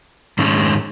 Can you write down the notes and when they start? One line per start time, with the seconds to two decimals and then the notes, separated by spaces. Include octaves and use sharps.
0.38 G#2 D#3 G#3 C#4